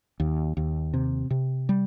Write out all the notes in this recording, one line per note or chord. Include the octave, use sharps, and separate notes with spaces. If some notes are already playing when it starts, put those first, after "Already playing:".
D#2
D#2
C3
C3
G3